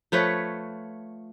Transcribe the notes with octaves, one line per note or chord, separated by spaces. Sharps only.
F3 A3 B4 C#5